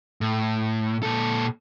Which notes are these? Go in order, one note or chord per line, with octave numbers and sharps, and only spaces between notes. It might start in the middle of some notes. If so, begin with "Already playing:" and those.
A2
A#2 A4